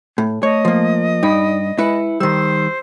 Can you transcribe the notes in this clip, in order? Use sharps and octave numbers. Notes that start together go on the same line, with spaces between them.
A2
A3 C#5 D#5
F3 A#3
G2 D#4 D5 B5
G#3 E4 B4 C#7
D#3 G3 C5 E6